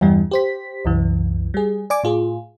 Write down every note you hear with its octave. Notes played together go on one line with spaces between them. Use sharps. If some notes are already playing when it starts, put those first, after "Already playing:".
E2 G2 E3 G3
G4 C5 B6
C2 F#2 E3
G3 G#4
D5 G#5 D6
A2 F4 G#4